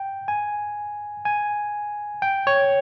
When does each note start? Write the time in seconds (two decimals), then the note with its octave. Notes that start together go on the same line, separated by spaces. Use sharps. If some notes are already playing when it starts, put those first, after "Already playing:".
Already playing: G5
0.28 G#5
1.25 G#5
2.22 G5
2.47 C#5